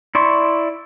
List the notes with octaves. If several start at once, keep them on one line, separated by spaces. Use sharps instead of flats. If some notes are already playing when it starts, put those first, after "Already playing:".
E4 D5 C6 C#6